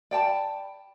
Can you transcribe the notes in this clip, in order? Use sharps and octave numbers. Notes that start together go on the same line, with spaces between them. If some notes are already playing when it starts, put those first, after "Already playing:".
D5 G5 A5 B5